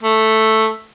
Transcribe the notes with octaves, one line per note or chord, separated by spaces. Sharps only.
A3